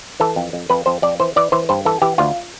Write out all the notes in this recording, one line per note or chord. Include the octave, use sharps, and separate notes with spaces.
E3 A4
F2
F2
F2 B4
F2 C5
F2 D5
E3 C5
E3 D5
E3 C5
G2 C5
E3 A4
E3 G4
D2 F4